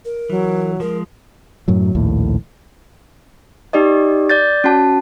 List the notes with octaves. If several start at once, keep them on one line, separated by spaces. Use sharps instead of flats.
A#4
E3 F#3
F3 G#3 A#4
F#2 A2 F#3
A#1 D#2 A2
D#4 G4 D5 D#5
D5 G6 A6
C#4 F#4 A5